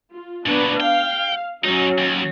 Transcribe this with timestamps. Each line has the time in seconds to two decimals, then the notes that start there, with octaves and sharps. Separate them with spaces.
0.12 F4
0.46 A#2 F#3 B3 D4 B4
0.80 F5 G5
1.64 F#2 F#3 C#4 D#4
1.98 D#2